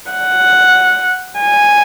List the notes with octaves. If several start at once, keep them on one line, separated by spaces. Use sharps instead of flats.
F#5
G#5